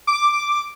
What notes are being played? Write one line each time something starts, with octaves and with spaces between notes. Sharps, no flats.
D6